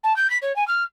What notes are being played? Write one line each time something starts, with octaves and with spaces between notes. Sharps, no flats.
A5
G6
B6
C#5
G#5
F6